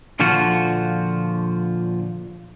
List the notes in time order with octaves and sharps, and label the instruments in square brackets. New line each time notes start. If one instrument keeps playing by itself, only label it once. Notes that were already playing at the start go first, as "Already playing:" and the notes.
[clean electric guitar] A#2 D3 F3 F4 F#4